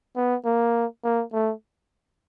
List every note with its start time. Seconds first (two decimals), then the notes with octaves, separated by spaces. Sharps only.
0.16 B3
0.45 A#3
1.04 A#3
1.33 A3